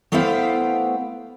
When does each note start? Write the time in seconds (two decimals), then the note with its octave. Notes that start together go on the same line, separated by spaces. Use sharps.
0.12 A3 B3 E4 C5 F5 G5